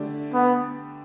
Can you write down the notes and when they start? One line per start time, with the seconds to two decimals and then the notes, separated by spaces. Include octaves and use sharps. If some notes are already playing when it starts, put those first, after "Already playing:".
Already playing: D3 A3 D4 G4 D5
0.34 B3